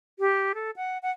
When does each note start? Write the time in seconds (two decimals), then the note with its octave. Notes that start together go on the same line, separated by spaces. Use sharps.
0.19 G4
0.55 A4
0.76 F#5
1.03 F#5